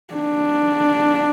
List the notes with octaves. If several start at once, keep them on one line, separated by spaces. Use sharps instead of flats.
D4